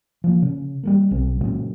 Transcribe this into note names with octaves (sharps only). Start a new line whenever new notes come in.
F3 A#3
C#3
G3 A3 A#3
B1 C4
A#2 C#3 F#3 G#3